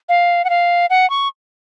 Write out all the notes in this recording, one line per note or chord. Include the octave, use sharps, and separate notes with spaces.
F5
F#5
F5
F#5
C#6